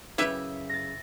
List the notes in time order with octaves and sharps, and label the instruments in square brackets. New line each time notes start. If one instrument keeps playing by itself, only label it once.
[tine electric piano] F#2 C#3 [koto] E4 G4 B4 [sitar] E5
[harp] A6 A#6